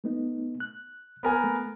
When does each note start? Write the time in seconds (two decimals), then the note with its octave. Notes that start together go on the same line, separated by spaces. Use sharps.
0.04 A3 B3 D#4
0.60 F#6
1.23 B3 A#4 G#5
1.44 A3